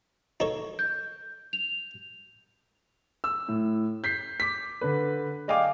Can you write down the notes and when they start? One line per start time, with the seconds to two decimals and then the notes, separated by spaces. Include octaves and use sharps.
0.40 D#4 A4 C#5
0.79 G6
1.53 F7
3.24 E6
3.48 A2
4.04 G6 B6 C7
4.40 D6 B6
4.81 D3 B4
5.48 D5 D#5 F5 G5 G#5 D6